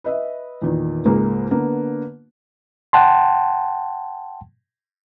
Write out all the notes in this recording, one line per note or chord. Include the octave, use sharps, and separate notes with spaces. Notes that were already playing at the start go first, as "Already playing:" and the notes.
B4 D#5 E5
E2 A#2 D#3
C#2 G#2 G#3 A#3
D3 A#3 B3
F#5 G5 A5 C6